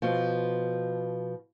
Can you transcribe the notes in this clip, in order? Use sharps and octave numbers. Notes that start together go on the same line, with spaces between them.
B2 F3